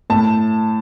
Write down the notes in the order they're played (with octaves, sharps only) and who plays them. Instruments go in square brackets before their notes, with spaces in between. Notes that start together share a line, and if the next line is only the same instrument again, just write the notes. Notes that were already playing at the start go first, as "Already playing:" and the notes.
[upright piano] A2 A5